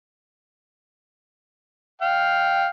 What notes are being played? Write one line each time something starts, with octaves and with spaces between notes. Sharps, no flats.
F5 G5